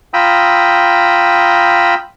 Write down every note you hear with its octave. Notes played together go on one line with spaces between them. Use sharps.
F4 G5 A#5 B5 D#6 E6